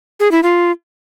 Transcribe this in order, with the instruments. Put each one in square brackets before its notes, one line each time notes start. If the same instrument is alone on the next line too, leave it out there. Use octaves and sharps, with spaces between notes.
[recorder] G#4
E4
F4